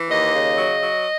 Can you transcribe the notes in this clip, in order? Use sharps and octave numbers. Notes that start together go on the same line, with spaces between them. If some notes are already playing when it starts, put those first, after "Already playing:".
Already playing: E3
D#2 D#5
C#3
F#3
F#3